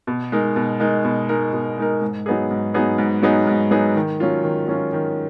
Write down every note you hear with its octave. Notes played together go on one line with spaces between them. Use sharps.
B2
G#3 D#4 A#4
B2
G#3 D#4 A#4
B2
G#3 D#4 A#4
B2
G#3 D#4 A#4
G#2
F#3 B3 D#4 G#4
G#2
F#3 B3 D#4 G#4
G#2
F#3 B3 D#4 G#4
G#2
F#3 B3 D#4 G#4
D#3
F#3 C#4 F4
D#3
F#3 C#4 F4
D#3